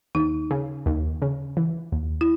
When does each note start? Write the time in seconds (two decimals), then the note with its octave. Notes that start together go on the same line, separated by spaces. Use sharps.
0.15 D#2 D#4
0.51 C#3
0.86 D#2
1.22 C#3
1.57 E3
1.92 D#2
2.21 E4